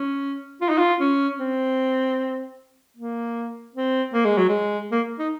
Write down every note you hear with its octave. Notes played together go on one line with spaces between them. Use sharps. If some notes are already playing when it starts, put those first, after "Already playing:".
Already playing: C#4
F4
D#4
F4
C#4
C4
A#3
C4
A#3
G#3
F#3
G#3
A#3
D#4